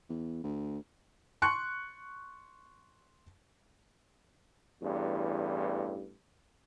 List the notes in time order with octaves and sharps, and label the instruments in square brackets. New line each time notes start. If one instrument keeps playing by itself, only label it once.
[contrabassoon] E2
D2
[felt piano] C6 C#6 F#6 C#7
[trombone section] A1 E2 G2